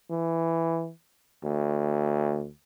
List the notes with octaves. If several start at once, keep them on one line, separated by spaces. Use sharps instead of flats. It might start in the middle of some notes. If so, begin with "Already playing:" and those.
E3
D2